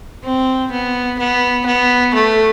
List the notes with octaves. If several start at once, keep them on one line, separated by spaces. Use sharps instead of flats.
C4
B3
B3
B3
A3